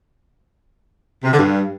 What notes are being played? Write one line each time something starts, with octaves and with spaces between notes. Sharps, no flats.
C3
D3
G2